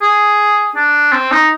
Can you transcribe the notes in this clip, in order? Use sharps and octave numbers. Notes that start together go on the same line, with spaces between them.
G#4
D4
C4
D#4